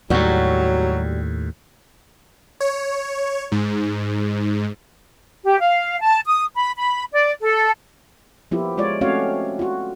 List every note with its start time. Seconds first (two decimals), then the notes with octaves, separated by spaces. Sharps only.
0.10 D#2 A2 F#3 G3 F#4
2.60 C#5
3.52 G#2
5.45 G4
5.60 F5
6.01 A5
6.26 D#6
6.55 B5
6.77 B5
7.12 D5
7.41 A4
8.51 F3 A#3 B3 E4 F4 G4
8.77 G#3 F4 C#5 D5
9.01 A3 C4 C#4 F#4 C#5 F5
9.59 F4 F#4